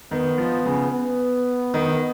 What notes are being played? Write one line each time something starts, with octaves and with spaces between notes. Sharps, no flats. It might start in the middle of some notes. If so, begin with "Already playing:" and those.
D#3 B3
F3
C#3
B3
D#3